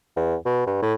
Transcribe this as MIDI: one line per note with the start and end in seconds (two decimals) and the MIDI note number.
0.17 0.35 40
0.46 0.62 47
0.67 0.79 43
0.82 0.94 45